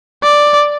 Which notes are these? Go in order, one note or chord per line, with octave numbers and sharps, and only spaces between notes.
D5